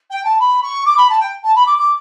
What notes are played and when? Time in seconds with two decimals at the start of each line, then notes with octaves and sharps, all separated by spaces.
0.10 G5
0.24 A5
0.40 B5
0.62 C#6
0.85 D6
0.97 B5
1.09 A5
1.20 G5
1.44 A5
1.55 B5
1.66 D6
1.78 D6